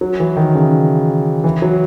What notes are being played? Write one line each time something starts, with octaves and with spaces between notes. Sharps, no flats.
F#3
E3
D#3
C#3
E3
F#3